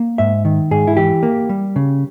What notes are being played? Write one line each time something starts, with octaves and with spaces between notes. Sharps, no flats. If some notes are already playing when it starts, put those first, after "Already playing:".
Already playing: A#3
G#2 E5
D#3
G#2 G#4
E4
E3 G4
A#3
G3
C#3